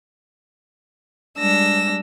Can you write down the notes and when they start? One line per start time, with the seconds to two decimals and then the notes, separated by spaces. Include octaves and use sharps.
1.38 G3 G#3 D4 E6 A#6